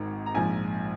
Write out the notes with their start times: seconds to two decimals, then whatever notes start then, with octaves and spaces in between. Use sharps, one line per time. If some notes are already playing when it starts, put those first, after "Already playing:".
Already playing: G#1 G#2 D#3
0.26 A#5
0.35 A#1 G#2 F3 G#5